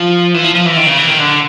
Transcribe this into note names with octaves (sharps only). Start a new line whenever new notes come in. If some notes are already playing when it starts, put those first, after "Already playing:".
Already playing: F3
E3
F3
F3
E3
D#3
C#3
E3
D#3
D3